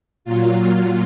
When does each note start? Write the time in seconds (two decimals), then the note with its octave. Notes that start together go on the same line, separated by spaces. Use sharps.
0.25 A#2 F#3 F4